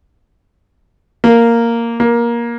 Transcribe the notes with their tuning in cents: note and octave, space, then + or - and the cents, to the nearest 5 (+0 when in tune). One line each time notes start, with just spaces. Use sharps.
A#3 -5
A#3 +15